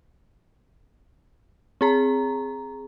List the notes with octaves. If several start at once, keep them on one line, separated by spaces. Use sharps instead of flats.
C4 G#4 A#5